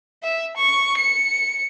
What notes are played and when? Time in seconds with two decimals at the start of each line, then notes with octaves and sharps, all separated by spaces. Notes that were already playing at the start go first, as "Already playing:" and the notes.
0.23 E5
0.57 C#6
0.98 C#7